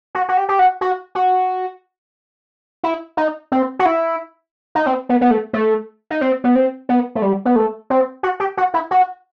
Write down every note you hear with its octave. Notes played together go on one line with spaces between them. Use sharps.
F#4
F#4
G4
G4
F#4
F#4
F#4
E4
D#4
C4
F#4
E4
D#4
C4
B3
B3
A3
A3
D#4
C4
B3
C4
B3
A3
G3
B3
A3
C4
F#4
G4
F#4
E4
F#4